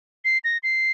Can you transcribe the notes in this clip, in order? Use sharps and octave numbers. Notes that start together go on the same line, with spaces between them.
C7
A#6
C7